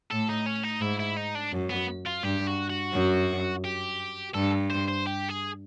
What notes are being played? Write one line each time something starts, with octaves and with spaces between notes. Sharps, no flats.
A2 A4
D#4
C#4
D#4
G#2 E4
E4
D#4
D4
F#2
B3
F4
G2 G4
F#4
F#4
F#2
G4
G2 A4
C5
C5
G4
G#4